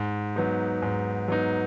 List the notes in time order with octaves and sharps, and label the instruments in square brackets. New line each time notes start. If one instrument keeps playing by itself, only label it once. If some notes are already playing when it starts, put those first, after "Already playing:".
Already playing: [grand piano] G#2
F#3 B3 D#4
G#2
F#3 B3 D#4